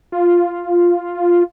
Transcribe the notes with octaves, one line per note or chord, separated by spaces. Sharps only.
F4